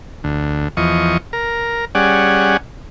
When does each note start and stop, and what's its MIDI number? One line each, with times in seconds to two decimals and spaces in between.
0.24 0.68 38
0.77 1.17 40
0.77 1.17 53
0.77 1.17 75
0.77 1.17 85
1.33 1.85 70
1.95 2.57 55
1.95 2.57 61
1.95 2.57 68
1.95 2.57 74
1.95 2.57 78